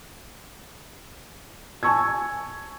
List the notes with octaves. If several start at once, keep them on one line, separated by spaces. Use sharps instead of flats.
G#5 A5 C#6 E6 G#6